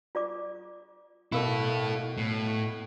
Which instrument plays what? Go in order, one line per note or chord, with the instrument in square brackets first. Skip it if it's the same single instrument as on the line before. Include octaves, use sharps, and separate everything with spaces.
[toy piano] F4 D5 D6
[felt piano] B2 F5 [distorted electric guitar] E4 A4 [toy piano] A#4 B5
[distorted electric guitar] A2